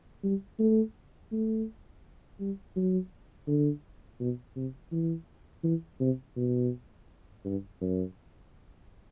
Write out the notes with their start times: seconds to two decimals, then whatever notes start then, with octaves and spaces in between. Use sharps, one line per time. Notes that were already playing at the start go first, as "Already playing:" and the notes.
0.23 G3
0.59 A3
1.32 A3
2.40 G3
2.76 F#3
3.47 D3
4.20 B2
4.56 C3
4.92 E3
5.63 E3
6.00 C3
6.36 B2
7.45 G2
7.81 F#2